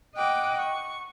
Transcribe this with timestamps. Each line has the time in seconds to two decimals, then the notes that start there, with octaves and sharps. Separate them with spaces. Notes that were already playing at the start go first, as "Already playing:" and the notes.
0.16 D#5 F#5 G5 D6
0.60 C#6